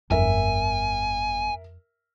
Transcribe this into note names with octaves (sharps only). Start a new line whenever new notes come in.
G1 F2 E4 A#4 E5 G#5